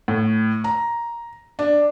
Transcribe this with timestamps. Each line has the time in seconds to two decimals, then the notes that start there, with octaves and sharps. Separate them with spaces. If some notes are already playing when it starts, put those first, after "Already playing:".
0.08 A2
0.64 A#5
1.59 D4